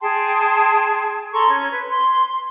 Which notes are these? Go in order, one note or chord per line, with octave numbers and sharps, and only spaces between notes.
G#4 G5 A5 C6
A4 A#5 C6 C#6
C#4
B4
C6